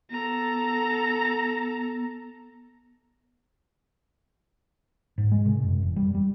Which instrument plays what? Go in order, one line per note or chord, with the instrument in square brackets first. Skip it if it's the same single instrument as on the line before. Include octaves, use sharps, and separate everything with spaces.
[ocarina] B3 [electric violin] A4 A#5
[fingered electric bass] G#2
G#3
C3
F#2
E1
G3
G3